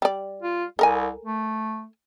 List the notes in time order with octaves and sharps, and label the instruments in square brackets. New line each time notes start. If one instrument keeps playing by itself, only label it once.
[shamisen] G3 D5
[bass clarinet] F4
[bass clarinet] C2 [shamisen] A4 A#4 G#5
[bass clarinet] A3